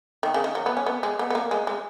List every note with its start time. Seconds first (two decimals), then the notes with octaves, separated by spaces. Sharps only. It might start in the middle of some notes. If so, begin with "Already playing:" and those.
0.23 D#3
0.34 C#3
0.44 D#3
0.55 F#3
0.66 B3
0.77 C#4
0.86 B3
1.03 G#3
1.19 B3
1.30 B3
1.35 A#3
1.51 G#3
1.67 G#3